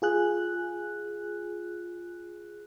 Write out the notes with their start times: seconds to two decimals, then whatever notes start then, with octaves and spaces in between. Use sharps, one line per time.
0.02 F4 G#4 F#6